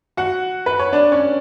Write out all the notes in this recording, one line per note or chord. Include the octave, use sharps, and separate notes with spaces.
F#4 F#5
B4
C#5
D4 D5
C#4 C#5